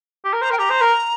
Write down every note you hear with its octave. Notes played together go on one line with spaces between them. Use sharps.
G4
A#4
C5 A#5
A#4 G5
G4 A#5
C5
A#4